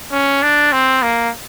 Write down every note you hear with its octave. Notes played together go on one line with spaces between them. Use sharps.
C#4
D4
C4
A#3